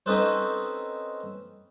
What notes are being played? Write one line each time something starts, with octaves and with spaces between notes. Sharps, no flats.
C4 C#4 D#4 A4 B4 C5